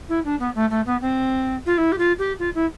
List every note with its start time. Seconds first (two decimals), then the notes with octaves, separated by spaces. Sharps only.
0.09 E4
0.25 D4
0.40 B3
0.55 A3
0.70 A3
0.86 B3
1.01 C4
1.66 F4
1.78 E4
1.92 G4
1.98 F4
2.18 G4
2.39 F4
2.55 E4